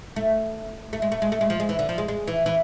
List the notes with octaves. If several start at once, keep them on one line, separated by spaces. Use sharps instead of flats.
A3
A3
G#3
A3
G#3
A3
G#3
F3
G#3
E3
D3
F3
G#3
G#3
E3
E3